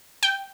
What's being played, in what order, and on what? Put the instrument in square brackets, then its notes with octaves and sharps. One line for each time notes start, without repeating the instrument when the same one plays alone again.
[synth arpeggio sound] G5